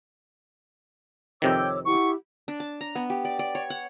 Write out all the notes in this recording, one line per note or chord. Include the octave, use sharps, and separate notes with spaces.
F2 C3 D#3 C#5 G5 D6 E6
E4 G4 F#5 C#6
D4
A5
A#5
B3
G4
D5
D5
C#5
F#5